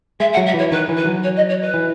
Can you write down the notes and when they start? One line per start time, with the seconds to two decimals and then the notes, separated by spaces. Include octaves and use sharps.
0.20 G#3 E5
0.33 F#5
0.37 F#3
0.46 E5
0.54 E3 C#5
0.71 D#3 B4
0.89 E3
0.97 B4
1.06 F#3
1.23 C#5
1.36 D#5
1.49 C#5
1.62 B4
1.74 E3